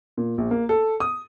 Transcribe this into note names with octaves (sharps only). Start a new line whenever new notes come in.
A#2
A#1
A#3
A4
D#6